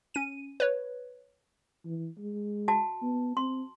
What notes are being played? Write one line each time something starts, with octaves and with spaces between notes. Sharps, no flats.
C#4 D#7
B4 C#5
E3
G#3
F#4 A5
B3
C4 C6